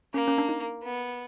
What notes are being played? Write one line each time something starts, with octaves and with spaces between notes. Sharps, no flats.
A#3 C#4
C#4
D4
D#4
B3